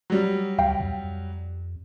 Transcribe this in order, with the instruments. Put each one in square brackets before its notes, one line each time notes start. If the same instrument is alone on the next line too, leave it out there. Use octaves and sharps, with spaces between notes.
[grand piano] F#3 G3
[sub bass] D2 [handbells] F5 G5
[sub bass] F2